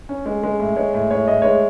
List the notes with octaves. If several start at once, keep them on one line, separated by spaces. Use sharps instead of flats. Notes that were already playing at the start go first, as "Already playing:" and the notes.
C#4
G#3
G#3
A2
G#3 C#5
A2
A2 C#5
A2 D#5
G#3 C#5